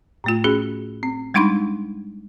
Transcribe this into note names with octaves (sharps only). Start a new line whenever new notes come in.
A2 A3 F4
C#4 F#4 G#4
C4
G3 G#3 D4 D#4 B5 C6